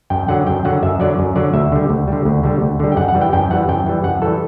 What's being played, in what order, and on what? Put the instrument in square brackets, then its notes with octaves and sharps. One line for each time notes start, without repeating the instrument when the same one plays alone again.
[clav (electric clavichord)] F#2 G5
D3 F#3 F#5
F#2 G5
D3 F#3 F#5
F#2 E5
D3 F#3 D5
F#2
D3 F#3 D5
D2 E5
D3 G3
D2
D3 G3
D2
D3 G3
D2
D3 G3
G5
F#2 F#5
F#5
E3 G3
G5
F#2 G5
E3 G3 F#5
F#2 G5
E3 G3
F#2 F#5
E3 G3 A4